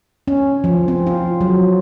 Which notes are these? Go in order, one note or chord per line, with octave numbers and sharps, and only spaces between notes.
C#4
F3
C4
F4
F#3